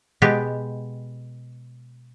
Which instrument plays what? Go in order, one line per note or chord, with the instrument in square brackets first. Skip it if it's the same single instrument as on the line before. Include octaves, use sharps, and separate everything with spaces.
[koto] B2 G#3 B3 G4 B4